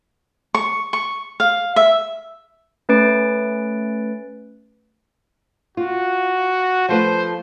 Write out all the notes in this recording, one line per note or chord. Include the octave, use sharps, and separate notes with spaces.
C#6
C#6
F5
E5
A3 C#4 B4 A6 D7
F4 F#4
F3 A3 B4 C5